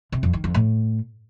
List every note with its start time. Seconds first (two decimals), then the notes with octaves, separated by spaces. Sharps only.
0.12 C3
0.23 F2
0.33 D#3
0.44 F2
0.54 A2